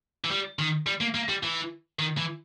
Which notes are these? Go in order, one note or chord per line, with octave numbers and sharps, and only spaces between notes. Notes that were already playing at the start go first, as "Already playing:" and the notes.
E3
G3
D#3
G3
A#3
A#3
G3
E3
D#3
E3